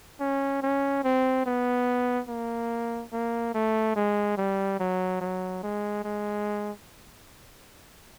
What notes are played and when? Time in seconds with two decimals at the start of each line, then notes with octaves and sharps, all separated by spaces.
0.20 C#4
0.62 C#4
1.04 C4
1.46 B3
2.29 A#3
3.12 A#3
3.54 A3
3.96 G#3
4.37 G3
4.80 F#3
5.21 F#3
5.63 G#3
6.04 G#3